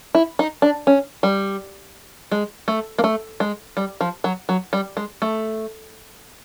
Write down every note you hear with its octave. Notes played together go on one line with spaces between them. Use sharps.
E4
D#4
D4
C#4
G3
G#3
A3
A#3
A3
G#3
G3
F3
F#3
F#3
G3
G#3
A3